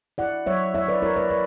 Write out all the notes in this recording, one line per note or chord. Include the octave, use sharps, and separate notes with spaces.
E4 D5 F#5
F#3 C#5 E5
E4 C#5 E5
B4 D5
E4 A#4 C#5
B4 D5
B4 D5